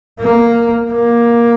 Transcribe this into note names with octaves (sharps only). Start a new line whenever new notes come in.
A#3
A#3